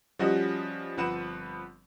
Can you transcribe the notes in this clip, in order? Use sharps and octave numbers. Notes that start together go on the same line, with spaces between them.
F3 G3 C#4 F#4 G4 D#5
G1 F3 C4 B4 F#5 E7